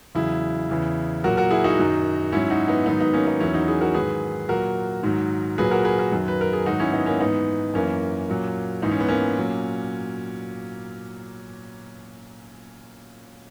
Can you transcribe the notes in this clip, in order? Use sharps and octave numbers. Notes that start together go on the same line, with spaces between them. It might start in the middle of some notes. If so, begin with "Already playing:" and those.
E2 C#3 F#3 E4 G#4
E2 C#3 E3
A#2 F#3 F#4 A#4
F#4 A#4
E4 G#4
D#4 F#4
F#2 D#3 F#3
G#2 F#3 C#4 E4
D#4 F#4
B3 D#4
G#2 D#3 F#3 B3 D#4
B3 D#4
A#3 C#4
B3 D#4
E2 D#3 F#3 C#4 E4
D#4 F#4
E4 G#4
F#4 A#4
G#2 D#3 F#3 G#4 B4
A#2 F#3 F#4 A#4
G#2 D#3 F#3
A#2 F#3 G#4 B4
F#4 A#4
G#4 B4
F#4 A#4
F#2 D#3 F#3
B4
A#4
G#4
G#2 D#3 F#3 D#4 F#4
C#4 E4
B3 D#4
A#3 C#4
G#2 E3 B3 D#4
F#2 E3 A#3 C#4
A#2 F#3
G#2 E3 D#4
C#4
B3
A#3 C#4
A#2 F#3